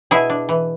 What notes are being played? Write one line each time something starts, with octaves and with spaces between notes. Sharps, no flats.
B2 E4 G#4
D4
E3